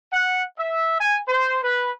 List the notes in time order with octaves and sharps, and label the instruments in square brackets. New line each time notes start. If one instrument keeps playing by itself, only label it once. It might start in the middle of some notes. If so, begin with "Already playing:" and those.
[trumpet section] F#5
E5
G#5
C5
B4